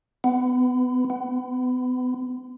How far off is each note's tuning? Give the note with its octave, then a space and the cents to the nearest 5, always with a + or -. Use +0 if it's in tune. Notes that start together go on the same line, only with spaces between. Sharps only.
B3 +25
B3 +35